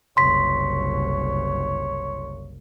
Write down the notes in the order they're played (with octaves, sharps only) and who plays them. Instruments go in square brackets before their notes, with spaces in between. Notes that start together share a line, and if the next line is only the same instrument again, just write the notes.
[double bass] F#1 C2 [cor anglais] C#5 [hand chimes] C6 B6